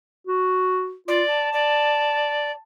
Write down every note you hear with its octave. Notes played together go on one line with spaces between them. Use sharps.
F#4
F4 D5
A5
D5